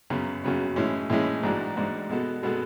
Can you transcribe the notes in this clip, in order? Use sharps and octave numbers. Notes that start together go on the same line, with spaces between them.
F#2 C#3 F#3 B3
F#2 C#3 F#3 B3
A2 E3 G#3 C#4
A2 E3 G#3 C#4
A1 G#2 G#3 D4 F#4
A1 G#2 G#3 D4 F#4
B2 G#3 B3 F#4 A4
B2 G#3 B3 F#4 A4